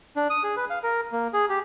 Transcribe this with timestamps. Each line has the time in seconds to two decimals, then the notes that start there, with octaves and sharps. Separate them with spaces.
0.16 D4
0.30 D#6
0.44 G#4
0.57 B4
0.70 F5
0.83 A#4
1.12 A#3
1.33 G#4
1.49 G4